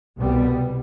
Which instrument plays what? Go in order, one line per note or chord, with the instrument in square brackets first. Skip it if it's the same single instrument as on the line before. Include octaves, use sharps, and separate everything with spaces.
[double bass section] C2 B2 G3 B3